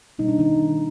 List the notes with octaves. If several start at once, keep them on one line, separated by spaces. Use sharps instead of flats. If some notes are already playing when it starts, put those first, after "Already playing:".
B2 G3 A#3 D#4
D4
D#3 D#4